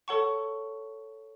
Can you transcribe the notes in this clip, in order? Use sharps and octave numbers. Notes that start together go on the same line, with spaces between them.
A4 C#5 F#5 A5 C#6